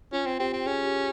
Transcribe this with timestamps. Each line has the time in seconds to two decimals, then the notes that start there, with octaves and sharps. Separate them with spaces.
0.12 C#4 F4
0.26 C4
0.40 C4 G4
0.53 C4
0.67 C#4 G#4
0.85 G4